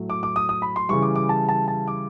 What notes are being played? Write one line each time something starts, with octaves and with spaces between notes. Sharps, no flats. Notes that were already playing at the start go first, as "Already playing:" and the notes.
Already playing: A2 F#3 A3
D6
D6
D#6
D#6
B5
C6
C#3 E3 G3 C#6
D6
D6
A5
A5
A5
D6